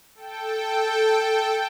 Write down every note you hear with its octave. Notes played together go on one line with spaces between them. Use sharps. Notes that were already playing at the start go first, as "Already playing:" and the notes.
A4 G5